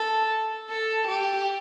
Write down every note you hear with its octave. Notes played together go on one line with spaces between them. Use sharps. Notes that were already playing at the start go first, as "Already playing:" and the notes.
Already playing: A4
A4
G4